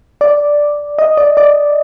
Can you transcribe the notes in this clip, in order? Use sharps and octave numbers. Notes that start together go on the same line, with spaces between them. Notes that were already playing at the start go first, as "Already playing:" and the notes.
D5
D#5
D5
D5